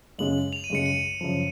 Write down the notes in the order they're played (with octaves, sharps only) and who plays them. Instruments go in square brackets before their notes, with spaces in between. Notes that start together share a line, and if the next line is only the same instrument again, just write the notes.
[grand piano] F#2 C#3 G#3 [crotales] F#7
[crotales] F7
D#7
[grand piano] F#2 C#3 G#3 [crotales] C#7
[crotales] D#7
[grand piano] F#2 C#3 F3